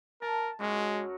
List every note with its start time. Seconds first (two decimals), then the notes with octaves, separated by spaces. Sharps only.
0.22 A#4 A5
0.60 F#2 F#3 G#3 A#4